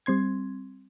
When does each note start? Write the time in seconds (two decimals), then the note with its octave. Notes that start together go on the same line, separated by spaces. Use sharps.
0.06 G3 C4 C6 G#6